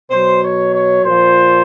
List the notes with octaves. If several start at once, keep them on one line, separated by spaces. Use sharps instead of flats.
B2 F#3 C5
C#5
C#5
A#2 F3 C5